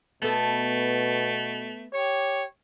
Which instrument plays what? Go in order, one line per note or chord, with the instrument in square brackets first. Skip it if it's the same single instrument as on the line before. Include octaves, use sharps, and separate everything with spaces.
[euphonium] B2 [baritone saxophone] A3 [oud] B3 A4
[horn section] G4 C#5